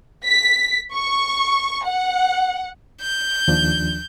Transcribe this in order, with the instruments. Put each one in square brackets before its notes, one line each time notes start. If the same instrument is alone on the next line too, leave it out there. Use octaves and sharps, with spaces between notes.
[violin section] B6
C#6
F#5
[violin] G6
[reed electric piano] D#2 F3 D4